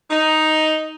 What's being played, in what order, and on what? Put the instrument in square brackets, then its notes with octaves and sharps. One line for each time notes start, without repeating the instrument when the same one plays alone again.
[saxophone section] D#4